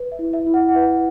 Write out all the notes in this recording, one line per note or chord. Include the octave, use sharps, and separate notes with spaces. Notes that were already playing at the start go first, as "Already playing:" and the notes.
Already playing: B4
E5
E4
E5
E4
F#5
F#5
B4 E5